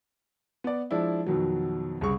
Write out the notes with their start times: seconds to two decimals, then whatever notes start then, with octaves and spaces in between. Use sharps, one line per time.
0.64 B3 D5
0.91 F3 G#3 D4 E4
1.27 F2 B2 D#3 F#3
2.01 C2 C#3 C#6